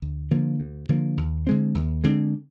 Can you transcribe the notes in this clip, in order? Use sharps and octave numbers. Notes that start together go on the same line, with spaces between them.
D2
D3 F3 A#3
D2
D3 F3 A#3
D#2
D3 G#3 C4
D#2
D3 G#3 C4